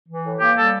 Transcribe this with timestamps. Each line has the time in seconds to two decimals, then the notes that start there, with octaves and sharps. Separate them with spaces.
0.08 E3
0.25 A2
0.40 A#3 G4
0.56 G3 A4